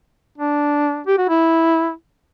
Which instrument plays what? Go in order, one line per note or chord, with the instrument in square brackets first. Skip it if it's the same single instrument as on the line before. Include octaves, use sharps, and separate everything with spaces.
[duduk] D4
G4
F#4
E4